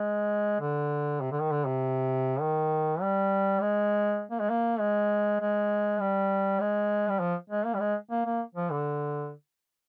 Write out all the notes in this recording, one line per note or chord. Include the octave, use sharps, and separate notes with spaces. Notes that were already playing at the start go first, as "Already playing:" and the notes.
Already playing: G#3
D3
C3
D3
D#3
D3
C3
D#3
G3
G#3
A#3
G#3
A#3
G#3
G#3
G3
G#3
G3
F3
G#3
A#3
G3
G#3
A#3
A#3
F3
D3